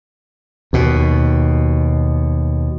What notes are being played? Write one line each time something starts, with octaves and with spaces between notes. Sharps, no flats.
D#2 B2